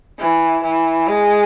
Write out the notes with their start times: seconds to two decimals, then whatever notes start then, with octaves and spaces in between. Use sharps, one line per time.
0.19 E3
0.63 E3
1.08 G#3